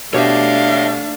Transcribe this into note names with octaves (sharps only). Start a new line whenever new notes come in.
B2 A3 D4 G4 C#5 E5 F5